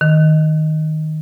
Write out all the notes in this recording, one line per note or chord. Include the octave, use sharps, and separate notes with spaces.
D#3